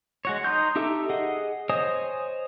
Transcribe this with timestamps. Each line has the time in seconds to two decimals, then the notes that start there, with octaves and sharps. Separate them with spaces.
0.25 G#3 F#4 C#5
0.44 D#4 C6 G6
0.76 D#4 G4 A4 E5
1.10 G#4 D#5 F#5
1.69 C5 C#5 D#5 G#5 D#6